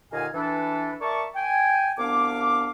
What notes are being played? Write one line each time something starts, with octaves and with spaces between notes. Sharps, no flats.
D#2 A#2 D3 D#5 F5 G#5
E3 D4 A4 B4
A#4 D5 E5 A5 C#6
G5 G#5
C2 B3 D4 F5 D6